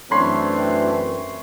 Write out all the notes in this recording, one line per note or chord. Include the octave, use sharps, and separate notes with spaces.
F#2 E3 A3 C4 D4 C#5 B5 C6